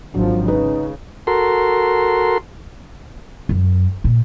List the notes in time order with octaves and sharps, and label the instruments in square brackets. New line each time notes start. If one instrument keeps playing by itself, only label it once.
[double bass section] G#1 F3 [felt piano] F#3 D4
[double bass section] C#3 [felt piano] D#4 B4
[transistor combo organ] F#4 A4 A#4 C6
[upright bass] F#2
A#2